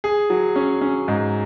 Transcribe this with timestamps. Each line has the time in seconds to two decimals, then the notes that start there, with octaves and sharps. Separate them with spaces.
0.04 G#4
0.30 F#3
0.56 C#4
0.81 C#4
1.08 G#2